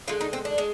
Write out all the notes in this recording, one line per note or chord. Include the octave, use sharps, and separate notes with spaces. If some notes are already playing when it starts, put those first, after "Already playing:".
D3 G#3 F4
D#4
C4
D4
G#3